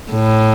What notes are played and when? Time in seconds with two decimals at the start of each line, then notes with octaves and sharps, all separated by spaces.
0.12 A2